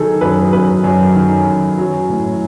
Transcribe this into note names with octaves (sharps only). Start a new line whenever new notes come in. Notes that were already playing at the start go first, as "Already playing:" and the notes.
Already playing: D#3 F#3 G#4 A4
F#2 B4
F#2 B4
F#2
D#3
F#2
F#3
A2